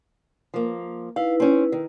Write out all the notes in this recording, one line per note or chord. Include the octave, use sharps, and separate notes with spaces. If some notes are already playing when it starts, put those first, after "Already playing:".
F3 A#3
D#4 E4 B4 F5
C4 C#4
D#3